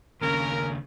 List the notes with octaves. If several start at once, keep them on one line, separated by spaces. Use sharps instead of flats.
D#2 C#3 C#4 A#4